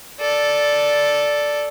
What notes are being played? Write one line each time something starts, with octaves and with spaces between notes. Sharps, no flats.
A4 D5